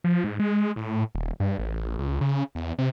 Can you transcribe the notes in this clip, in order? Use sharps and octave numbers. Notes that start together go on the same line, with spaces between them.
F3
G#2
G#3
A2
D#1
G2
A1
C#2
C#3
E2
C3